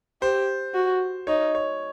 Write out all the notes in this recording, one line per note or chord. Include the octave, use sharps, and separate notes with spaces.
G4 C5
F#4
D#4 C#5
C#5